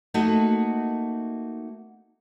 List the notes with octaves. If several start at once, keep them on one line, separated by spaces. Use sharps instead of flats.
A3 A#3 D#4 F#4